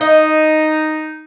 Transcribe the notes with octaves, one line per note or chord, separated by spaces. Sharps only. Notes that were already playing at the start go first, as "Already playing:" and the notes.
D#4 D#5